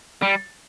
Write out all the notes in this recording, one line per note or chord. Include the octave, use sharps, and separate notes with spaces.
G3